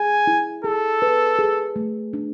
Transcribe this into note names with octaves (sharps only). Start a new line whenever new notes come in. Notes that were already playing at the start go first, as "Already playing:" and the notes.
Already playing: G#4 G#5
E4
G#4 A4
B4
G#4
A3
D4